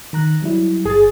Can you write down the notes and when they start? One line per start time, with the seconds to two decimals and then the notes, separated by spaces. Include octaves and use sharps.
0.13 D#3 A#5 F#6
0.42 F#3 G3 E4
0.85 G1 G#4 A6